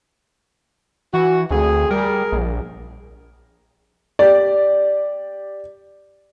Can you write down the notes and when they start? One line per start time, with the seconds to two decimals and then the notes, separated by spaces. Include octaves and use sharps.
1.14 E3 F#4
1.51 D2 A3 C4 G#4
1.91 G3 G#4 A#4
2.32 A#1
4.19 G4 D5